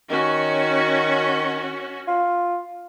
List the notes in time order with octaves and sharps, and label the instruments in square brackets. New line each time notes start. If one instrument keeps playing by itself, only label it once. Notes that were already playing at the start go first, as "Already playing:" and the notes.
[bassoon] D#3 [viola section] C#4 F#4
[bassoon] F4